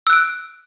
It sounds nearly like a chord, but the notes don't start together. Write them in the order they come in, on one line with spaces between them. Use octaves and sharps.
E6 F#6 D7